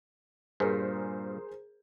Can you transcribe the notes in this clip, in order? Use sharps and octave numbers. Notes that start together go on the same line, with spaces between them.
G2 A#2 G#4 A#4 C5